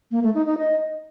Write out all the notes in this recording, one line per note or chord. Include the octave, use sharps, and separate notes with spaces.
A#3
A3
D#4
D#4
D#5